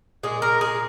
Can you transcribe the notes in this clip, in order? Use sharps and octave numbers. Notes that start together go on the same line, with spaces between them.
A#2 G#3 G#4
A#4
G#4